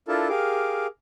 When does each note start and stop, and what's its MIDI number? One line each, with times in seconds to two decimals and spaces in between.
0.08 0.29 62
0.08 0.29 64
0.08 0.29 65
0.08 0.29 69
0.08 0.29 70
0.08 0.29 81
0.29 0.87 67
0.29 0.87 68
0.29 0.87 70
0.29 0.87 77
0.29 0.87 86